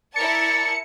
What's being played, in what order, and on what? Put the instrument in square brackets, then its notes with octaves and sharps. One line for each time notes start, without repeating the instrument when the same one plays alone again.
[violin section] E4 A#4 A5 [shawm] D5 [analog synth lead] C#7